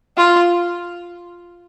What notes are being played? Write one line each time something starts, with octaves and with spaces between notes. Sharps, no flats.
F4